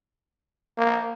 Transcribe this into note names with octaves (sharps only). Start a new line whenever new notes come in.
A#3